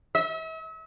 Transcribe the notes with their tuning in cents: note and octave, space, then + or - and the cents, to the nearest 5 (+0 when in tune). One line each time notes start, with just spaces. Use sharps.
E5 -40